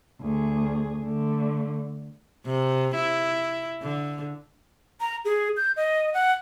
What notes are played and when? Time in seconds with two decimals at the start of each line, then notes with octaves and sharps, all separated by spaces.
0.22 D2 G#4
1.03 D3 A3
2.46 C3
2.95 E4
3.82 D3
5.00 A#5
5.25 G#4
5.57 G6
5.77 D#5
6.14 F#5